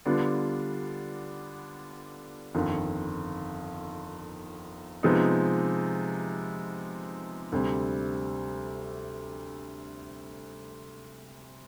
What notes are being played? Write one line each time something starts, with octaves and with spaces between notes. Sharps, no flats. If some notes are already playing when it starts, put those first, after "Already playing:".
D3 G3 B3 D4 F4
G1 F2 D#3
C3 F3 G#3 B3 D#4
D2 C3 G3 C4